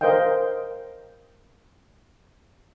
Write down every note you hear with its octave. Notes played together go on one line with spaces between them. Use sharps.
A#4 C5 D#5 F5 G5